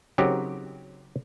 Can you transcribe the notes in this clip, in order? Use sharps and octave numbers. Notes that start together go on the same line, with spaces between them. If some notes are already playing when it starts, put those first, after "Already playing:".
C#3 F#3 C4 D#4 G4 A#4